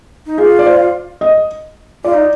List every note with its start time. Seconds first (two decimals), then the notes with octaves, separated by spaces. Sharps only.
0.26 D#4
0.38 F4 G#4
0.59 D5
0.66 C5
1.21 D#5
2.04 F4 D5
2.14 D#4